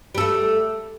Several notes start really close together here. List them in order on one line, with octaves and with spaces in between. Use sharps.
G3 A4 A3